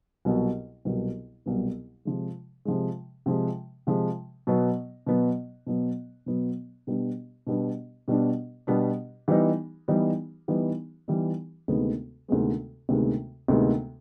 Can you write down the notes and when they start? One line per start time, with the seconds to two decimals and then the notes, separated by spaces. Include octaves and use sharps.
0.25 C2 B2 F#3 B3
0.85 C2 B2 F#3 B3
1.46 C2 B2 F#3 B3
2.05 C3 F3 G#3
2.65 C3 F3 G#3
3.26 C3 F3 G#3
3.87 C3 F3 G#3
4.47 B2 F#3 B3
5.06 B2 F#3 B3
5.67 B2 F#3 B3
6.26 B2 F#3 B3
6.87 B2 G3 B3 D4
7.47 B2 G3 B3 D4
8.08 B2 G3 B3 D4
8.67 B2 G3 B3 D4
9.28 E3 G3 B3 D#4
9.88 E3 G3 B3 D#4
10.48 E3 G3 B3 D#4
11.08 E3 G3 B3 D#4
11.68 D2 C3 D#3 G#3 B3
12.28 D2 C3 D#3 G#3 B3
12.89 D2 C3 D#3 G#3 B3
13.48 D2 C3 D#3 G#3 B3